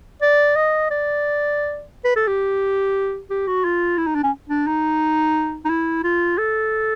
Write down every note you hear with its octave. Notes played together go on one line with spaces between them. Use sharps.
D5
D#5
D5
B4
A4
G4
G4
F#4
F4
E4
D#4
D4
C#4
D4
D#4
D#4
E4
F4
A4